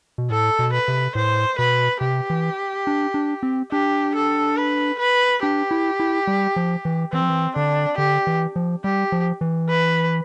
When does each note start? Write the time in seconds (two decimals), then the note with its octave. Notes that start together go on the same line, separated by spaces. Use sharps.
0.18 B2
0.30 A2 A4
0.59 B2
0.73 B4
0.88 C3
1.15 A2 C5
1.58 B2 B4
2.01 C3 G4
2.30 E3
2.87 D4
3.14 D4
3.43 C4
3.72 D4 G4
4.15 A4
4.57 B4
4.99 B4
5.43 D4 G4
5.71 E4
6.00 E4
6.27 G3
6.56 F3
6.85 E3
7.12 E3 C4
7.22 F3
7.29 E3
7.56 D3 D4
7.98 D3 G4
8.27 E3
8.56 F3
8.84 G3 G4
9.12 F3
9.41 E3
9.69 B4